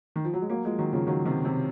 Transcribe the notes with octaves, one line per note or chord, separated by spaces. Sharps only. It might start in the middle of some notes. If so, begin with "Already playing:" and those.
D#3
F3
F#3
G#3
F#3 A#3
F3 G#3
D#3 F#3
C#3 F3
D#3 F#3
C3 D#3
C3